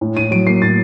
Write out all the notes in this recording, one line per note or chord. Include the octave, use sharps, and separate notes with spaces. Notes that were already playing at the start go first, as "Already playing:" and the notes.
A2
A2 D#7
F#3 D7
A#3 C7
A2 A6